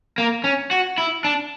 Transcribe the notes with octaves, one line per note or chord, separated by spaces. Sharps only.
A#3
C#4
F#4
E4
D4